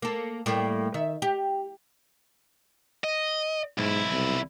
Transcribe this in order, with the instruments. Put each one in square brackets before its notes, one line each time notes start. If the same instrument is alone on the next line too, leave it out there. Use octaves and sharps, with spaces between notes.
[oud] A#3 A4
A2 G3 A#3
D#3 E5
G4
[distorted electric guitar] D#5
[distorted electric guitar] B1 E4 [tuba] G#2
[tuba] C2